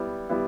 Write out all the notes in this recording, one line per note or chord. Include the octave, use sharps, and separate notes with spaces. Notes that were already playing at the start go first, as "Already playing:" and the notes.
Already playing: G3 B3 E4
G3 B3 E4